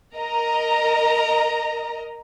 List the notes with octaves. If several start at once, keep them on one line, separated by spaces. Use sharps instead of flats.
A#4 D#5 A#5